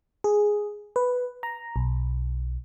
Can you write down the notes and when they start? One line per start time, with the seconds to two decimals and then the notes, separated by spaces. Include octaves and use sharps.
0.24 G#4
0.96 B4
1.43 A#5
1.76 B1